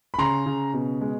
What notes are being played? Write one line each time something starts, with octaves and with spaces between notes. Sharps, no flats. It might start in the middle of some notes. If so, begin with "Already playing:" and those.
B5
C#3 A#5 C6
C#3
B2
G#3